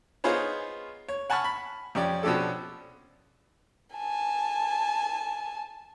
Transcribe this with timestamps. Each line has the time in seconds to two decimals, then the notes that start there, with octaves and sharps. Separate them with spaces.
0.24 B3 D#4 F4 G#4 C5 C#5
1.08 C#5
1.30 F#5 G#5 A5 B5 C#6 F6
1.44 B5
1.95 F2 C#4 G4 D5
2.23 B2 F3 C#4 D4 G4 A4
3.96 G#5 A5